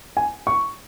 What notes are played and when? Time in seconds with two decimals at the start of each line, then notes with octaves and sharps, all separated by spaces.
0.17 G#5
0.47 C#6